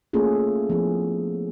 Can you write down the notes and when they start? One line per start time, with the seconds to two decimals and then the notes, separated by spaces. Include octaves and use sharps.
0.13 A3 A#3 C#4 F4 G#4 A4
0.70 F3 B3 E4 G#4